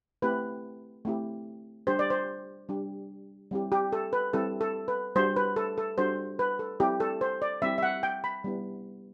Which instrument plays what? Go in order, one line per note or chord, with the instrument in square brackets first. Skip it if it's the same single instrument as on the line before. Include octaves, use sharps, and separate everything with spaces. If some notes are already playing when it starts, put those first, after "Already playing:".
[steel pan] A3 C4 E4 G4 B4
A3 C4 E4 G4
G3 D4 G4 C5
D5
C5
G3 D4 G4
G3 C4 E4 G4
G4
A4
B4
G3 C4 E4 G4 A4
A4
B4
G3 D4 F#4 C5
B4
A4
A4
G3 D4 F#4 C5
B4
A4
G3 C4 E4 G4
A4
C5
D5
G3 C4 E4 G4 E5
E5
F#5
G5
B5
G3 B3 E4